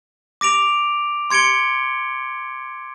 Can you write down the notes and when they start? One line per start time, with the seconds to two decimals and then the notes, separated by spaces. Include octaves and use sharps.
0.41 D6 A#6 D7 F7
1.30 C6 G#6 C#7 D7 G7